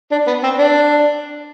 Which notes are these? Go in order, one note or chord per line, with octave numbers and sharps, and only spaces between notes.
D4
B3
C4
D4